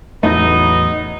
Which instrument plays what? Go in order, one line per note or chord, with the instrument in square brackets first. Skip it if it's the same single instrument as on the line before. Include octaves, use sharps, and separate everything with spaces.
[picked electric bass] A1 E2 A3 [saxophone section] F#3 B3 D#4